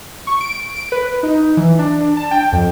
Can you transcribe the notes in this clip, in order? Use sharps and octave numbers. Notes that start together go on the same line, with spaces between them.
C#6
D7
D7
B4
D#4
E3
D4
A5
G5
F2